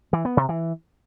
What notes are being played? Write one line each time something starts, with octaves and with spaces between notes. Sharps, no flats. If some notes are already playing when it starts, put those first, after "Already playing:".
E3
B3
C3
E3